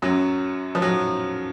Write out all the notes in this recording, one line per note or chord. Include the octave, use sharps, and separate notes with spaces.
F#2 F#3
F3
F#3